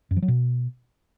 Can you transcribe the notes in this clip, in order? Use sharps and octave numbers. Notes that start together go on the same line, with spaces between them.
F#2
F3
F#3
B2